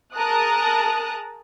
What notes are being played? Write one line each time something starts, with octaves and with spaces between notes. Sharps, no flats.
G#4 A#4 A5 A#5 D#6 F#6